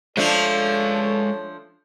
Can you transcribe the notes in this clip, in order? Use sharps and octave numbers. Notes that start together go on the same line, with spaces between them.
F3 G#3 A3 D4 A4 C#5 F5